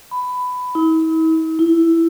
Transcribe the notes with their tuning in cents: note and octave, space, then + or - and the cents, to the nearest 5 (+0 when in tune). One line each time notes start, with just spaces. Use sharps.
B5 +15
E4 -45
E4 +5